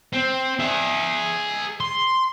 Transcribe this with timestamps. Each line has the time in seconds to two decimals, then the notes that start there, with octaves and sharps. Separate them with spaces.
0.13 C4
0.59 G#4 E5
1.80 C6